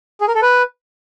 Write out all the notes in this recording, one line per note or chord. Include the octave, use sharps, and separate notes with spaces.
G#4
A#4
A4
B4